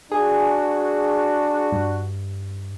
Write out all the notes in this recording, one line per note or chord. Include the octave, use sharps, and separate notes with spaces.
D4 F#4 G#4
G2